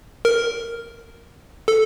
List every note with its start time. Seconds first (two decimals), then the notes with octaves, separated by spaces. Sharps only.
0.25 A#4
1.68 A4